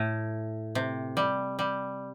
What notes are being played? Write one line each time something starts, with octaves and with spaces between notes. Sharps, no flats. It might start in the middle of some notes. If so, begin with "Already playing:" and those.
Already playing: A2
C3
G3
G3